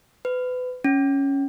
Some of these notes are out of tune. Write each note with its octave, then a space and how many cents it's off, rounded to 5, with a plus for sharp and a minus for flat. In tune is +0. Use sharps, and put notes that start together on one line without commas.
B4 +30
C#4 +0